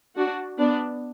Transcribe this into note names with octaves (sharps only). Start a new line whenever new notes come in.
D4 F#4
B3 D4